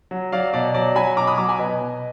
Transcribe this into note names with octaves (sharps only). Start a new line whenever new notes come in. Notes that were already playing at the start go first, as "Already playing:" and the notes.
F#3
F#3 D5 F5
B2 D5
F#3 D5
F#3 G#5 B5
B2 A#5 D6
B5 D#6
F#3 A#5 D6
G#5 B5
B2 B4 D#5
B2